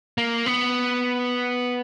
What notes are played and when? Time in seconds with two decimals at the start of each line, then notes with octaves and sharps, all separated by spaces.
0.18 A#3
0.46 B3